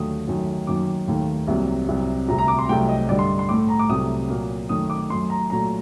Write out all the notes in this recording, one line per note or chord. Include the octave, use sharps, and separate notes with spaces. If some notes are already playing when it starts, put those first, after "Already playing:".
Already playing: D#2 D3 F#3 A3 D#6
F#2 D#3 F#3 A3
F#2 D#3 F#3 A#3 D6
D#2 D#3 A3
C2 C3 F#3 A#3
C2 C3 F#3
D2 C3 G3 A#5
A#5
D6
C6
C2 C3 F#3 A3 G5
D#5
G2 D3 G3 D5
C6
C6
A2 A3 D6
A#5
D6
C2 C3 F#3 A3 D#6
A#2 F#3 A#3
F#2 D#3 A3 D#6
D6
F#2 F#3 A3 C6
A#5
A#2 F#3 A3 A#5